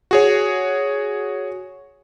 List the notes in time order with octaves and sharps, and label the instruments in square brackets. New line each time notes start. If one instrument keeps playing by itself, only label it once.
[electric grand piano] F#4 G#4 C#5